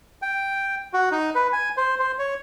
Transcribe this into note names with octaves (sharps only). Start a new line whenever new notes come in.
G5
F#4
D#4
B4
G#5
C5
C5
C#5